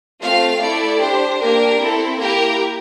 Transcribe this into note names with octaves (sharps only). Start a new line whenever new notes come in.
A3 C4 F4 F5
A3 E4 A4 D5
D4 G4 C5
A#3 D4 G4 A#4
C4 E4 A4
A#3 E4 G4 A#4